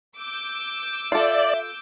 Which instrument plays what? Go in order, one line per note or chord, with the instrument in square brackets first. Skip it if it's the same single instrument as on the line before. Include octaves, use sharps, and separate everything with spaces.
[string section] D6 E6 G6
[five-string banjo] F4 A4 [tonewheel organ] D5 [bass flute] E5